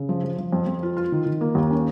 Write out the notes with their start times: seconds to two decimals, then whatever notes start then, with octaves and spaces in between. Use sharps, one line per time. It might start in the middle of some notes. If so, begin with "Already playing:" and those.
Already playing: C#3
0.09 F3
0.24 F3
0.38 F3
0.52 F2
0.67 F2
0.83 F4
0.97 F4
1.12 D#3
1.26 D#3
1.41 A#3
1.55 D#2
1.70 C#4